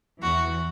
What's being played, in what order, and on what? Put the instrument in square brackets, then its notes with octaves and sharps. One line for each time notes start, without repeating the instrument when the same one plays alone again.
[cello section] E2 E3 [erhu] F#4